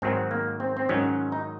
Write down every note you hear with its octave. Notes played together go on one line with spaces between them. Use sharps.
G#2 D#3 F#3 C4
A#3
C4
C4
G#2 D#3 F#3 C#4
D#4